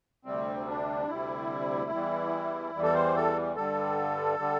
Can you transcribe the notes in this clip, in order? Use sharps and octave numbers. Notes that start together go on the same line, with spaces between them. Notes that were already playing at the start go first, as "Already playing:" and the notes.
D2 C3 G3 C4
D4
D2 C3 G3 E4
E2 E3 G3
E2 E3 G3
A4
C5
A4
G2 D3 G3 A4
D3 G3